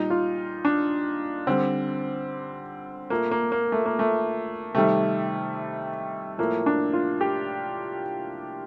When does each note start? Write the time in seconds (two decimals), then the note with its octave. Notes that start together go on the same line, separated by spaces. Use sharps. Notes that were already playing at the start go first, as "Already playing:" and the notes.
Already playing: A#2 G3 D#4
0.10 F4
0.65 D4
1.47 D3 G3 C4
3.10 A#2 A3 A#3
3.31 A#3
3.52 A#3
3.72 A3
3.86 A#3
3.99 A3
4.75 C3 D#3 G3 A3
6.38 A2 F3 A3 A#3
6.66 D4
6.93 F4
7.21 G4